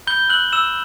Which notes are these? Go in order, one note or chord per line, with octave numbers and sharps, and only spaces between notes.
B5 G6 G7
E6 F#6 G6 F#7
B5 E6 E7